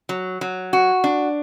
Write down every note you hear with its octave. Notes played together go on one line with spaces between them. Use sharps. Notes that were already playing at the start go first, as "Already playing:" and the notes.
F#3
F#3
F#4
D4